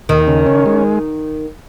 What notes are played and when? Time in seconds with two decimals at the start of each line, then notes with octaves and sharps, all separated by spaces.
0.09 D#2 D#3
0.27 C#3
0.46 C#4
0.66 G#3